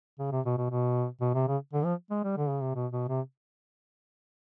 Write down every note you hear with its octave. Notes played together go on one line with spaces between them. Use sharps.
C#3
C3
B2
B2
B2
B2
C3
C#3
D3
F3
G#3
G3
D3
C#3
C3
B2
B2
C3